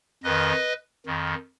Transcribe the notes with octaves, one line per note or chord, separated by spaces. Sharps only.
F2 D#3 B4 D#5
F2 D#3